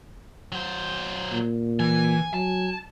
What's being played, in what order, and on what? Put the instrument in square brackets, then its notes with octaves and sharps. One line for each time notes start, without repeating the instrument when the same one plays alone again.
[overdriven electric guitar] F#3 C5
[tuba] A#2
[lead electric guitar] E3 [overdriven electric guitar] G#5
[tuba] F#3 [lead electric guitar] A5